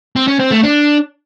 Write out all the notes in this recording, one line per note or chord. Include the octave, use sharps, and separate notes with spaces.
C4
C#4
C4
A3
D4